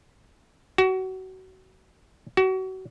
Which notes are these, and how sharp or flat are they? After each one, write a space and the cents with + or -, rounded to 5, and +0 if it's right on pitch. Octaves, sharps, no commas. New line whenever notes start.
F#4 +25
F#4 +30